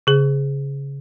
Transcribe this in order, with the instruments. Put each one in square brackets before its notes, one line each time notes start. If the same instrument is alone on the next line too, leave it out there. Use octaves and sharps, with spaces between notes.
[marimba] C#3 G#4